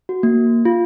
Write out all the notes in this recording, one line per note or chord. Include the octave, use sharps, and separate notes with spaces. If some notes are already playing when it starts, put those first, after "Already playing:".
F#4
A#3
F4